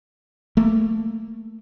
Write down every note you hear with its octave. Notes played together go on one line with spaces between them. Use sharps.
A3 A#3